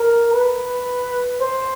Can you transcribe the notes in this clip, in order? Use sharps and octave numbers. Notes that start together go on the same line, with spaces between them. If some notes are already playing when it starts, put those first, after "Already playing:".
Already playing: A#4
B4
C5